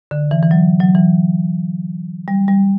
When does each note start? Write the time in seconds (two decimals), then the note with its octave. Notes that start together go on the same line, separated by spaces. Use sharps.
0.11 D3
0.31 E3
0.43 E3
0.51 F#3
0.80 F#3
0.95 E3
2.28 G3
2.48 G3